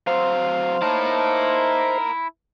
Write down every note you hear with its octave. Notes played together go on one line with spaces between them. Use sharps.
F#3 C4 C5 F5
D#4 E4 A#4 F5 A5